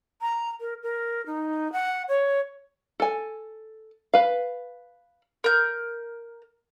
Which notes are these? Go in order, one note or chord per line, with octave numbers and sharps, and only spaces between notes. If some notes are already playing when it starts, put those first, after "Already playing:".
A#5
A#4
A#4
D#4
F#5
C#5
A4 G#5
B4 F5
A#4 G6